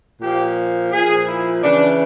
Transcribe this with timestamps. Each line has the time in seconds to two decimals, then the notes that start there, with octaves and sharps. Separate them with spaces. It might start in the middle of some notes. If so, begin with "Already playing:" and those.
0.21 A#2 F3 G4
0.92 A#2 F3 G#4
1.28 E4
1.63 C#3 E3 D4